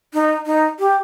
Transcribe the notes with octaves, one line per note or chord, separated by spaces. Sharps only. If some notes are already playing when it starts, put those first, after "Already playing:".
D#4
D#4
G4